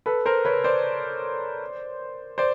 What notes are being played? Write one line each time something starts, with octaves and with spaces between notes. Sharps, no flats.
A4 B4
A#4 C5
B4 C#5
C5 D5
C5 D5